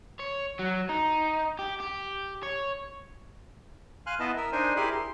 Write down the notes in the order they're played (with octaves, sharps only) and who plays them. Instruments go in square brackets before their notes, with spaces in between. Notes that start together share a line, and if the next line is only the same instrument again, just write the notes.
[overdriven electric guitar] C#5
F#3
D#4
G4
G4
C#5
[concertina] F5 G#5 C6 F6 F#6
B3 E4 B4 D#5 A5
A#4 E5
D4 D#4 A#4 C5 G#5
E4 G4 G#4 A#4 B5 C6
C6